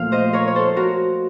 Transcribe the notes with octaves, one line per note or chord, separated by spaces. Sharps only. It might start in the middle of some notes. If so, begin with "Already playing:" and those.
Already playing: A#2 F3 A3 F5
C5 D#5
A#4 C#5
C#5
A4 C5
F#4 A#4